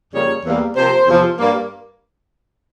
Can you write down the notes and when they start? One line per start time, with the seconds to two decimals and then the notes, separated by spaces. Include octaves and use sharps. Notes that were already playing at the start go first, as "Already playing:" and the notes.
0.14 F2 C#3 G3 A#3 C#5
0.46 E2 E3 G3 A#3
0.76 C3 F3 A#3 C5
1.08 E2 C3 F3
1.38 G2 G3 A#3